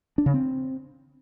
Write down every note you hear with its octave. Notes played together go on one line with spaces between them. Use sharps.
D4
C#3
C4